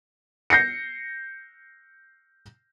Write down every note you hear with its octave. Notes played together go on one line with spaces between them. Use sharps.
G6 A#6 C7 C#7